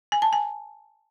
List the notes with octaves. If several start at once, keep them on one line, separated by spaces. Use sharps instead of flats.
G#5
A5
G#5